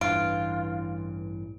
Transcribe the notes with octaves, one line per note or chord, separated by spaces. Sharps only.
A1 G2 E3 F4 D7